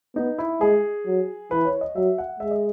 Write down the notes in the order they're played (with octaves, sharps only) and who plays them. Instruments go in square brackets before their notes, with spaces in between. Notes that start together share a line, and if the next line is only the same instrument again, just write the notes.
[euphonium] B3 [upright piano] D#4
[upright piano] E4
[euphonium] G#3 [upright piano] G#4
[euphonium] F#3
[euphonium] E3 [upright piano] B4
[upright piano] C#5
D#5
[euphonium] F#3 [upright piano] E5
[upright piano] F#5
[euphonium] G#3 [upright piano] E5
[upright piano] D#5